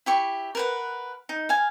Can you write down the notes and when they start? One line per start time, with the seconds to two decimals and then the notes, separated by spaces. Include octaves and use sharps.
0.06 E4 G4 C#6
0.55 A#4 B4 F#5
1.29 D#4
1.49 F5 G#5